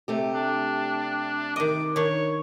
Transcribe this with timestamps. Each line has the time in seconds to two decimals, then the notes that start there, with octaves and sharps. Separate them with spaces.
0.08 C3 A3 G4
0.34 D4
1.56 D#3 D#5 D6
1.96 D#3 D4 C#5